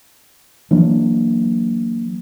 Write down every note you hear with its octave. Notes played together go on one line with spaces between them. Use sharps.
E3 F#3 A#3 D4